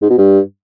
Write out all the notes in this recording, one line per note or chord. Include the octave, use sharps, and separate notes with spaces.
G#2
B2
G2